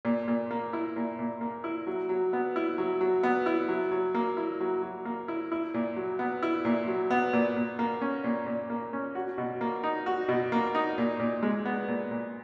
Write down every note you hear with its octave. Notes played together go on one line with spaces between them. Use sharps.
A#2
A#2
A#3
E4
A#2
A#2
A#3
E4
F#3
F#3
B3
E4
F#3
F#3
B3
E4
F#3
F#3
A#3
E4
F#3
F#3
A#3
E4
E4
A#2
F#3
B3
E4
A#2
F#3
B3
A#2
A#2
A#3
C#4
A#2
A#2
A#3
C#4
F#4
B2
A#3
D#4
F#4
B2
A#3
D#4
A#2
A#2
G#3
B3
A#2
A#2